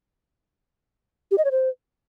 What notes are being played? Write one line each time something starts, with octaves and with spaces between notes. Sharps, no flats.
G4
D#5
C#5
C5